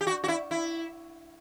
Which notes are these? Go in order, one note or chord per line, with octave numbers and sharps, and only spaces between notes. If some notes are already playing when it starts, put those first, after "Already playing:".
G4
F#4
F#4
E4
E4